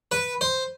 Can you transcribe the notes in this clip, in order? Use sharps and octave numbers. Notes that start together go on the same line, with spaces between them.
B4
C5